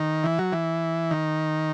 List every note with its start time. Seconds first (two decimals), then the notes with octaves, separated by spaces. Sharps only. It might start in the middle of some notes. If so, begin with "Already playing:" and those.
Already playing: D#3
0.24 E3
0.39 F#3
0.52 E3
1.10 D#3